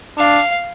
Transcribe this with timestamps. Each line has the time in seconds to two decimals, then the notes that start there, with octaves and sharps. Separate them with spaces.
0.18 D4 F5